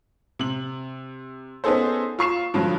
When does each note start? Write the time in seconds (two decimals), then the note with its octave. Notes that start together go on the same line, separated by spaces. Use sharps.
0.39 C3 F#7
1.64 B3 C#4 D#4 G#4 A4 C5
2.19 F4 C#6 C7 E7
2.54 G2 D3 F3 F#3